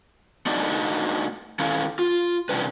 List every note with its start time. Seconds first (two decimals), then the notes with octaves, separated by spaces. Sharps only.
0.46 A3 D4 D#4 F#4 D5 D#5
1.59 D#3 C#4 E4 A4 F5
1.99 F4
2.49 C3 D#3 E3 C#4 D4 B4